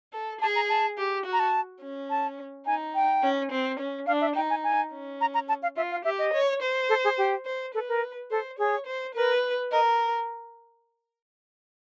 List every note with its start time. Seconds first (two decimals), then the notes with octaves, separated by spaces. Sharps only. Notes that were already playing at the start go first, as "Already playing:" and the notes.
0.13 A4
0.41 G#4 A5
0.56 A#5
0.69 A5
0.98 G4
1.25 F#4
1.33 A#5
1.39 A5
1.81 C#4
2.10 A5
2.66 D#4 G#5
2.95 G5
3.22 C#4
3.52 C4
3.79 C#4
4.07 D4 F5
4.21 E5
4.35 D#4 G5
4.50 G#5
4.64 G#5
4.92 C#4
5.21 A#5
5.34 A#5
5.48 A5
5.63 F5
5.77 F4 E5
5.91 F5
6.04 G4 E5
6.19 D#5
6.33 C#5
6.62 C5
6.89 A4
7.04 G#4
7.17 G4
7.46 C5
7.74 A4 B4
7.88 A#4
8.30 A4 C5
8.58 G#4 C#5
8.86 C5
9.15 A#4 B4
9.71 A#4 D#5